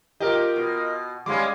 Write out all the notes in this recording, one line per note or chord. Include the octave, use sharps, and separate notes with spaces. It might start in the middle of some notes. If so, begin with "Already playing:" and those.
F4 G4 A#4 D#5
B2
G3 G#3 C#4 F5 C6 D6